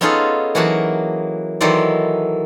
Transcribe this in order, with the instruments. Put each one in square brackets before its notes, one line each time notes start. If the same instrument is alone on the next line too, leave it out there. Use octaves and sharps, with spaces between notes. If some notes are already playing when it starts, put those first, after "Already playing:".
[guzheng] B3 C#4 D#4 F4 G#4 A4
E3 F#3 A#3 F#4 G#4 A5
D#3 E3 F#3 A4 C5 D5